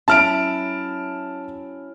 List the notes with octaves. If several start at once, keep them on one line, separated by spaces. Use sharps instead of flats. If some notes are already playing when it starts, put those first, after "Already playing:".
F#3 C#4 E4 A5 F6 D7